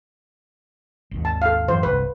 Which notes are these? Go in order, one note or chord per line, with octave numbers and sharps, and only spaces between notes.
G#1 D#2 D#3
A5
A4 F5
F#2 A2 E3 C5
G1 C2 B4